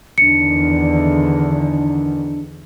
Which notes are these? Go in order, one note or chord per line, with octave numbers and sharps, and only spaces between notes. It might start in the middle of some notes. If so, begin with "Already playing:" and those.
E2 D3 D#3 D4 C#7